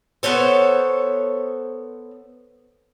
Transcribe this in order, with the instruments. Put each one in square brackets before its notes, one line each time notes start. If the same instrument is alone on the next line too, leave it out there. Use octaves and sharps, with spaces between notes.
[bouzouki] B3 A4 C5 C#5